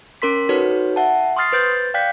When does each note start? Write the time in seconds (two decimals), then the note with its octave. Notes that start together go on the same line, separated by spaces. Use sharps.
0.22 C#4 A#4 C6 B6
0.49 D#4 F#4 A4 B4 C#5
0.96 E5 F#5 A5
1.36 C6 C#6 D#6 F6 A6 C7
1.52 B4 C5 G6 A6
1.94 D5 F5 G5 F#6 G6 B6